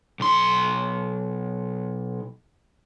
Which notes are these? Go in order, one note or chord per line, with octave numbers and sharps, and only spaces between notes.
B1 C6